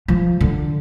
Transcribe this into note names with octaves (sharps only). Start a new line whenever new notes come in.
F3
D3